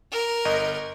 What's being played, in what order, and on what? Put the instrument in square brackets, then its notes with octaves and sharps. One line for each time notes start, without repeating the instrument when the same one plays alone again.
[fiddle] A#4
[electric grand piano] G1 D#5